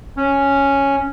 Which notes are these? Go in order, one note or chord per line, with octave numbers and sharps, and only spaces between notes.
C#4